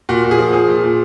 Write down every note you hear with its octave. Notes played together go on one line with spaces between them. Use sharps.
A#2 F#4
A#2
G#4
F3
F3 G#4
A#2
A#2